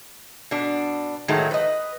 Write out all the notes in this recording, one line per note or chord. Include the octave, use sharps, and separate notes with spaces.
B2 D4
A2 D#3 F#3 G#3 A3
B4 D#5